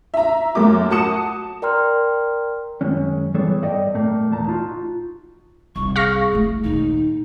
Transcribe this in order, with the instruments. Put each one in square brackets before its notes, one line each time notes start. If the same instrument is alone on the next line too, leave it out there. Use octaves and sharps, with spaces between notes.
[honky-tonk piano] E5 A#5
F#2 A3 A#3 A#4 D6
F#4 A5 D#6 C#7 E7
[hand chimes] A#4 D5 G5 A#5 C6 F6
[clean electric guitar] F#2 D#3 G#3 C#4
E3 G3 B3 G#4 A4 C#5
G2 A4 D5 D#5 G5
A#2 A3 A#3
E2 A#2 A5 A#5
D#4 F4 F#4
[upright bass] C2 D#4 [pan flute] C#6
[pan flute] G#4 [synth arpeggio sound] F5 C#6 A#6
[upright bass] A3 E4
[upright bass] D#2 A#2 [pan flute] D#4